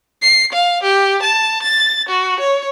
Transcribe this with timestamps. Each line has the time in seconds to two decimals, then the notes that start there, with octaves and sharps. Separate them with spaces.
0.22 C7
0.53 F5
0.83 G4
1.22 A5
1.63 A6
2.09 F#4
2.40 C#5